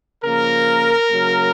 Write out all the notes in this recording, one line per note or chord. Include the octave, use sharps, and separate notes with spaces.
C#3 F3 A#3 A#4
C#3 F#3 A#3